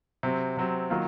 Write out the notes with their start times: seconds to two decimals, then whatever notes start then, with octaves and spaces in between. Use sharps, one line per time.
0.23 C3 F#3 C4
0.57 C3 F#3 C4
0.90 D#3 F#3 A#3 F4